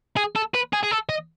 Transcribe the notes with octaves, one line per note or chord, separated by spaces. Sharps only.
G#4
A4
B4
G#4
G#4
A4
D#5